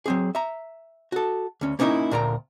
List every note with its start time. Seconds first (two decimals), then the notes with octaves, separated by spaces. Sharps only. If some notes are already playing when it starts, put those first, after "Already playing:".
0.06 F#3 C4 G#4
0.35 E5 A#5
1.12 F#4 A4
1.61 D2 C#4
1.79 A#3 B3 C#4 D#4 E4 A#4
2.11 D2 A#2 A#4 G5 A#5